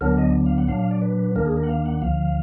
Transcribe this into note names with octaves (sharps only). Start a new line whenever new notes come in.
D2 D3 F#3 B3 D4 A#4
D#5
F5
F#5
A#2 F#3 D4 F5
F5
D5
B4
D#2 D#3 A#3 D4 A#4
G#4
A#4
F#5
F5
F#5
D2 D3 F3 F5